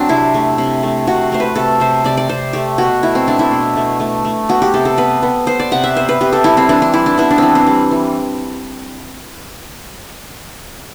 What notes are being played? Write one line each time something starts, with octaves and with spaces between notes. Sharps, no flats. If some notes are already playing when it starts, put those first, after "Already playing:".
Already playing: F#3 C4 D4
C3 E4
A3
C3
A3
C3 F#4
A3 C5
B4
C3 A4
C3 C5
C3 D5
D5
C3 C5
A3 G4
B2 F#4
A3 E4
C4
A3 D4
E4
B2
A3
A3
A3
B3 F#4
G4
C3 A4
A4
B3 B4
B3
B3 C5
D5
C3 F#5
E5
B3 C5
B4
C3 G4
A4
G3 E4
C4
E3 D4
D4
G3 E4
D4
B3 E4
D4
E3 C4
C4
G3
E3